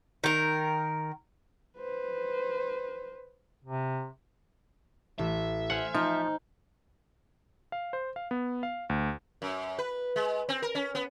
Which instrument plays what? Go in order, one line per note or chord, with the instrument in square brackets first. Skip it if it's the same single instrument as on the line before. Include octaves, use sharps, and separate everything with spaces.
[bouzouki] D#3 A#4
[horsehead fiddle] B4 C5
[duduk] C3
[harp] A1 [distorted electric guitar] E5
[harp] C5 G#5 F6 [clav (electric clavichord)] F#5
[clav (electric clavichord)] F3 [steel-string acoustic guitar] D#4
[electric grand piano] F5
C5
F5
B3
F5
D2
[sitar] F#2
B4
G#3
C4
A#4
C#4
B3